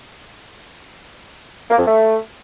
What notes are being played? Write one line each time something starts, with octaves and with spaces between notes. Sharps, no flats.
A#3
F2
A3